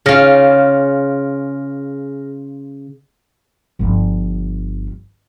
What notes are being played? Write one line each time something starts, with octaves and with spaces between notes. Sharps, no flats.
C#3 F4 G#4 F6 A#6
G1 F3